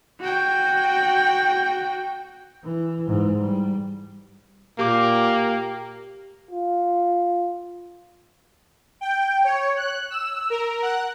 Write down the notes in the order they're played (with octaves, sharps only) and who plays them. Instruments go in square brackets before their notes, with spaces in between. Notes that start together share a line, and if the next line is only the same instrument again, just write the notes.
[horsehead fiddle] F#4 G5
[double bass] E3
G#2 E3
G3
[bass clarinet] A#2 [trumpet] A#3 [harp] G4 D6
[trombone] F4
[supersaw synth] G5
C#5
F#6
E6
A#4
F#5